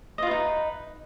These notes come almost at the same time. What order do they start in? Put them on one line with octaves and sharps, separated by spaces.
D#5 F4 B4 D#4